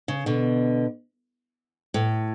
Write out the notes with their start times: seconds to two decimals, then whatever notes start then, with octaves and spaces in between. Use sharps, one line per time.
0.08 C#3
0.26 B2 D3
1.94 A2